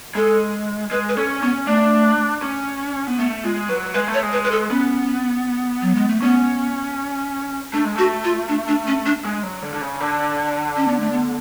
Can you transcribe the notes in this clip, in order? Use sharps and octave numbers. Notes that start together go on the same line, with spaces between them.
G#3 A4
G#3 B4
B4
C#4 A4
B3 C#4
A3 D4
C#4
B3
A3 B3
G#3 F4
F#3 B4
G#3 B4
A3
C#5
G#3
B4
B4
A4
B3 C#4
F#3
G#3
A3
B3 C#4
A3 D4
G#3
A3 F#4
F4
D4
D4
C#4
D4
G#3
F#3
D3
D3
C#3
D3
C#4
B3
A3
B3